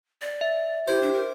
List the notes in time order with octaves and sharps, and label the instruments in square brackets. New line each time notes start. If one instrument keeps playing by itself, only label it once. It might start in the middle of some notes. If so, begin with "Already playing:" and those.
[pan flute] D5
[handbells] E5
[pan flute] E4 [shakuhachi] G4 [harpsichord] C5
[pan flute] D4
A#4